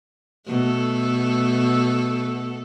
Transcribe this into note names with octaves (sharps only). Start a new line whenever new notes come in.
B2 A3 A4